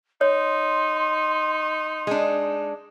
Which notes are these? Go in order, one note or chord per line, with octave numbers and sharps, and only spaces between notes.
D#4 C#5 C6
G#3 D4